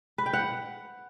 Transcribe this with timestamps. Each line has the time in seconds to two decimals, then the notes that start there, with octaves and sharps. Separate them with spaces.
0.18 B4
0.26 G5
0.33 F#5